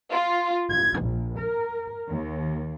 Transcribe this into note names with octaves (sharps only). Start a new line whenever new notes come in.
F4
G#6
A#1
A#4
D#2